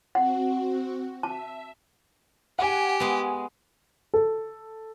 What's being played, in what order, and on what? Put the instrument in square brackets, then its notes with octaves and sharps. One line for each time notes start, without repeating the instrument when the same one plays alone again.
[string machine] C4 F#4 [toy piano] F#5
[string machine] E5 [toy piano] A5
[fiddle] G4 [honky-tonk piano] F#5 G#5
[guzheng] G#3 B3
[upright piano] A4